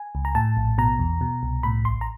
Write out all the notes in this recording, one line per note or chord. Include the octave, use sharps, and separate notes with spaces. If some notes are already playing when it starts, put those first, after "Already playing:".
Already playing: G#5
C#2
A#5
A2 A5
A#1
B2 A#5
E2
B2
C2
A2 B5
A1 C6
A#5